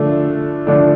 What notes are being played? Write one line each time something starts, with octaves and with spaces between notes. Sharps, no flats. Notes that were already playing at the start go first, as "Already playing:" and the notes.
Already playing: D3 F3 A3 D4
D3 F3 A3 D4